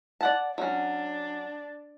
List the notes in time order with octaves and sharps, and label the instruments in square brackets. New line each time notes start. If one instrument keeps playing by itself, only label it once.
[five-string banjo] D5 F#5 A5
[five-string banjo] F#3 C#4 [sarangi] D4